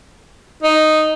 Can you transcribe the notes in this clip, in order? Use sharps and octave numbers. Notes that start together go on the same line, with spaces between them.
D#4